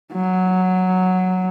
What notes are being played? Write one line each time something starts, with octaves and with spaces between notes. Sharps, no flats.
F#3